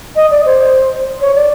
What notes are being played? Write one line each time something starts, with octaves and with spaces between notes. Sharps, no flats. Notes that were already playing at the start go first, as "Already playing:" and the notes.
D#5
D5
C5
C#5
D5